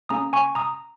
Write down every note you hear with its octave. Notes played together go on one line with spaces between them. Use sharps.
A#3 C#4 G#4 A#5 D#6
G#5 C#6
A#5 D#6